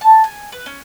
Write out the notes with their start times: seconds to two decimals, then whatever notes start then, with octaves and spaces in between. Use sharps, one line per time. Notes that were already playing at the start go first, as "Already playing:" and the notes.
0.01 A5
0.24 G#5
0.52 B4
0.66 C#4